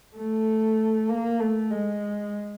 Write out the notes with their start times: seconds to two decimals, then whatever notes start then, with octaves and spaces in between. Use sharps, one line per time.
0.16 A3
1.09 A#3
1.40 A3
1.70 G#3